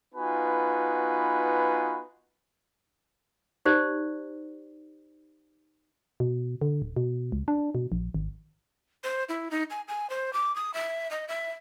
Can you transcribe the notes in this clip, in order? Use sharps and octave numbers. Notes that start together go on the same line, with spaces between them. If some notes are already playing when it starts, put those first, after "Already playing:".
B3 D#4 F4 F#4 B4 G#5
D#4 G4 C5 D5
B2
D3
D1
B2
C#2
D4
B2
A#1
G#1
C5
E4
D#4
G#5
G#5
C5
D6
D#6
E5
D#5
E5